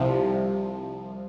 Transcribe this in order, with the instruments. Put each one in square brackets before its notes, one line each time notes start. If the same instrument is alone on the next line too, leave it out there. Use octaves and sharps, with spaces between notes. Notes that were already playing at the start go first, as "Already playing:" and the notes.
Already playing: [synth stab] C2 C3 F3